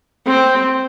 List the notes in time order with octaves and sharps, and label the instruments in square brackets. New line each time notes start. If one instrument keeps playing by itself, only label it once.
[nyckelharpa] C4